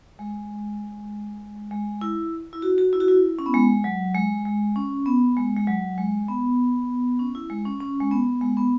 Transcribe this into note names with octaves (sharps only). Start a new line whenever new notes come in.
G#3
G#3
E4
E4
F#4
F#4
E4
F#4
E4
C#4
B3
G#3
F#3
G#3
G#3
C#4
B3
G#3
G#3
F#3
G#3
B3
C#4
E4
G#3
C#4
C#4
G#3
B3
G#3
B3